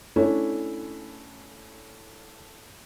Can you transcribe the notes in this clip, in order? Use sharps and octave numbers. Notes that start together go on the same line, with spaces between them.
A3 C#4 D4 E4 C#5